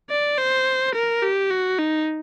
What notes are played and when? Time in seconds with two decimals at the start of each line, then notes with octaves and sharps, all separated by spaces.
0.10 D5
0.38 C5
0.95 A#4
1.23 G4
1.51 F#4
1.79 D#4